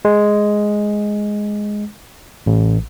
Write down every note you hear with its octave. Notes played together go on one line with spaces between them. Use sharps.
G#3
A1